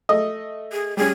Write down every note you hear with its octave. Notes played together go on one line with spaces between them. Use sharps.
A3 D#5
G#4
G3 C#4 G#4